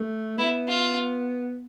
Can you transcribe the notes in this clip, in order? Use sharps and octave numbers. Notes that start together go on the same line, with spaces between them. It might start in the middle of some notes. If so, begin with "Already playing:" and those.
Already playing: A3
B3 E4
F4